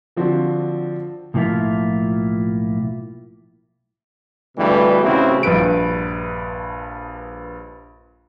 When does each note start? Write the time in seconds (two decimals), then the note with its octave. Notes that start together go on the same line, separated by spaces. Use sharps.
0.17 D3 F3 C4 D4 F#4
1.34 B1 A2 F3 A#3 E4 F4
4.58 D2 G2 B2 E3 G3
5.03 A1 C#3 C4 E4 F#4
5.43 A#1 G2 B4 D7